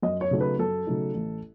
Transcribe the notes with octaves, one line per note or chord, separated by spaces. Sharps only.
F#2 D#5
C#5
C#3 F#3 A3 D#4
B4
F#2 A4
C#3 F#3 A3 D#4
A1